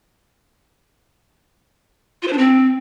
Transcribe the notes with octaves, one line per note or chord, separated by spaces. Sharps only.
F4
C5
D4
C4